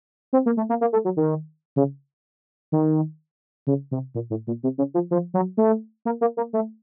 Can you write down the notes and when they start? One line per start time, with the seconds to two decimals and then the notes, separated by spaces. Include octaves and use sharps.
0.33 C4
0.46 A#3
0.57 A3
0.69 A#3
0.81 A#3
0.93 A3
1.05 F#3
1.17 D#3
1.76 C#3
2.72 D#3
3.67 C#3
3.91 C3
4.15 A#2
4.30 A2
4.47 A#2
4.63 C3
4.78 C#3
4.94 F3
5.11 F3
5.34 F#3
5.57 A3
6.05 A#3
6.21 A#3
6.37 A#3
6.53 A3